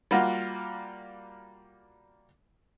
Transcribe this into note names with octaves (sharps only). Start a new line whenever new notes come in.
G3 A#3 F4 F#4